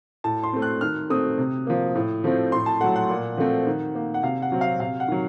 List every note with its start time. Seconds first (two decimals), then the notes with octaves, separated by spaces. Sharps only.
0.24 A2 A5
0.43 C6
0.53 A3 C4
0.62 F#6
0.81 D#3 F6
1.10 A3 C4 D#6
1.38 C3
1.67 F3 A#3
1.95 A2
2.24 F3 A3 C4
2.52 A2 C6
2.66 A5
2.80 F#3 A3 F#5
2.96 F#5
3.09 A#2
3.37 F3 A3 C4
3.67 D#3
3.95 A#3
4.14 F#5
4.23 C3 F5
4.42 F#5
4.52 F#3 C4
4.61 F5
4.80 C3 F5
5.00 F#5
5.08 D#3 F#3